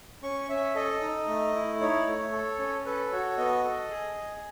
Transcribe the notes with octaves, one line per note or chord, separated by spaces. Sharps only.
C#4 C#6
C#4 E5
A4 D#5
D#4
A3
E4
D#4 C#5
A3
A4
C#4
A4 B4
F#4 C#5
B3 D#5
A4
G#4
G#4